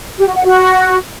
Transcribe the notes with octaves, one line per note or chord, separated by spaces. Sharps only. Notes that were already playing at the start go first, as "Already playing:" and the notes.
G4
F#4
F#5
F#4